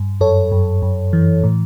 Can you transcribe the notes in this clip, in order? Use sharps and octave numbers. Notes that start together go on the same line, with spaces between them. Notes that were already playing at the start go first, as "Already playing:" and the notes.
Already playing: G2
F#2 A4 C#5
F#2
F#2
E3
A2